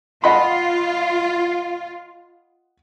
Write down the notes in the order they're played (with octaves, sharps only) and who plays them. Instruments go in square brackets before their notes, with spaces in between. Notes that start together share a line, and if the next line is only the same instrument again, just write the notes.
[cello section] F4 [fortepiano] D#5 F#5 B5